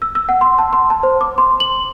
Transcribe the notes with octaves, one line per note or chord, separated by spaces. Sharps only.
E6
E6
F#5
C6
A5
C6
A5
C5
D6
C6
F#7